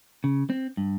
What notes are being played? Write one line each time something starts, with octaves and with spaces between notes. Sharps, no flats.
C#3
C4
G2